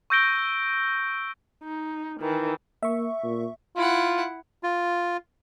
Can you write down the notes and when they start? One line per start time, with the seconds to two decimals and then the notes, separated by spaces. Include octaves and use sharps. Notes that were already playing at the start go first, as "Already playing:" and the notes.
0.10 C#6 E6 G6 A#6 D7 G7
1.63 D#4
2.21 D#3 E3
2.83 A#3 E5 C#6
3.24 A#2
3.76 E4 F4 F#5
4.63 F4